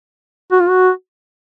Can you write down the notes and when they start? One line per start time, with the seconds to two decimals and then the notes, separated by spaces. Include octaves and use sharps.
0.52 F#4
0.60 F4
0.69 F#4